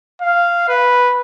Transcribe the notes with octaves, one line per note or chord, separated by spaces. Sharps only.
F5
B4